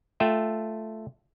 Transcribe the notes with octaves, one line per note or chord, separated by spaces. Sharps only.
A3 F4 E5 G5